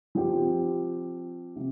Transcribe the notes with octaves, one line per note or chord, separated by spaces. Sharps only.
F3 C4 G4
C3